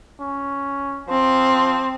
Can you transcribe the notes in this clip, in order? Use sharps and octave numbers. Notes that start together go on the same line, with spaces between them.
C#4
F3 C4